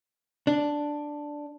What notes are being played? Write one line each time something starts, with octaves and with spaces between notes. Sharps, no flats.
D4